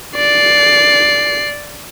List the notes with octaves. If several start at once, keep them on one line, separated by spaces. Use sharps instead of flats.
D5 C7